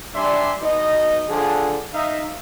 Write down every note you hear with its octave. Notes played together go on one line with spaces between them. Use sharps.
G3 D4 D5 E5 G#5 C6
B2 D#4 D#5
D3 F3 G#4
D#4 E5 F5